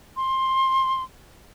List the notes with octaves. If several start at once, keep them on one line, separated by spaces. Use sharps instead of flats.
C6